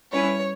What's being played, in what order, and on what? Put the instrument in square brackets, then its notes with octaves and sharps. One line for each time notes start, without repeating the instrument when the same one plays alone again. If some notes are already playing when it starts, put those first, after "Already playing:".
[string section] G3 C#4 E4 B4 [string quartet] C#5